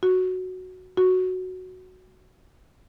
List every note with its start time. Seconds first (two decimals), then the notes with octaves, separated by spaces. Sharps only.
0.03 F#4
0.97 F#4